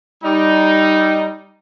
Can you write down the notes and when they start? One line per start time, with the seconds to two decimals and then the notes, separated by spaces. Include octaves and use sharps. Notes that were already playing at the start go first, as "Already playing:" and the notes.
0.23 G3 D#4